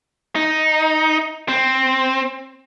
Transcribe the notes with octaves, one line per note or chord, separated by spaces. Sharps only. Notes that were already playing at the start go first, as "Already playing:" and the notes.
D#4
C4